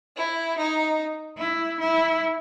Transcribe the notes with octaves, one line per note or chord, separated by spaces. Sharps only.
E4
D#4
E4
E4